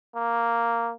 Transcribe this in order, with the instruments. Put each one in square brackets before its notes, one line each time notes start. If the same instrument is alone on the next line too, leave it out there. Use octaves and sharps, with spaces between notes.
[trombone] A#3